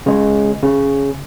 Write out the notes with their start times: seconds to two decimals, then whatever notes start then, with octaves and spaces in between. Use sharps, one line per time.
0.06 C#3 G#3
0.63 C#3